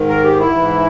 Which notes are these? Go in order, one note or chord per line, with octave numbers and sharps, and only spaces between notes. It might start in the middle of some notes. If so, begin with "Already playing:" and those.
Already playing: G#2 D#3
A#4
G4
E4
G#2 E3